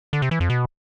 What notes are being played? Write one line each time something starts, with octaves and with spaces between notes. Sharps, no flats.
D3
C3
E3
F2
B2